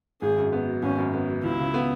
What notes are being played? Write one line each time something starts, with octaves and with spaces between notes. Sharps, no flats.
G#1 G#4
F#2
B3
F#3
G#1 C#4
F#2
B3
F#3
C#2 E4
C#3
B3